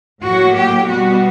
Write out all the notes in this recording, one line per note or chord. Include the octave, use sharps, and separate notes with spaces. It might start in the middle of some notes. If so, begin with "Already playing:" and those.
A2 F#3 A#3 F#4
G4
B2 G3 B3 F#4